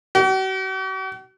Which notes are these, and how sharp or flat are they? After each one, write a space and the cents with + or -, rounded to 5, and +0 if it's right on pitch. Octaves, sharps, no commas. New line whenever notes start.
F#4 +45